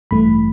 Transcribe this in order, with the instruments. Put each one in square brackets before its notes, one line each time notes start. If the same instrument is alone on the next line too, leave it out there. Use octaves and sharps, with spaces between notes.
[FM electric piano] A1 G2 E3 A3 B5